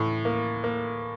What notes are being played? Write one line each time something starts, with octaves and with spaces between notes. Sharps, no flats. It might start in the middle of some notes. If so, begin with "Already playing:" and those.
Already playing: A2 E3
A#3
A#3